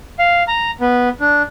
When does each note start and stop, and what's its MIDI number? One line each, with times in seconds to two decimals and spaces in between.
0.19 0.43 77
0.48 0.71 82
0.80 1.09 59
1.20 1.42 62